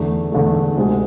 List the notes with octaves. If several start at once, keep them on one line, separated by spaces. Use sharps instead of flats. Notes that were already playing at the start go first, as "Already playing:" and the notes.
Already playing: E2 D3 A3
E2 D3 A3
D2 C3 G#3